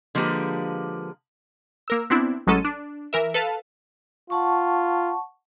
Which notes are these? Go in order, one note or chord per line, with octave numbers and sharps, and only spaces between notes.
D3 F3 G#3 A#3 G4 B4
A#3 A#4 E6
B3 C4 D4 E4
A1 F#3 G#3 C#4 A4 D#7
D4
E3 A#4 E5
A4 B4 F5 A5
F4 F#5 A5 C#6